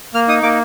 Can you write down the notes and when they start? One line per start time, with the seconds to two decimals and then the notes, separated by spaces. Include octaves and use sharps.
0.14 A#3 F6
0.28 D#4 D#6
0.43 A#3 D6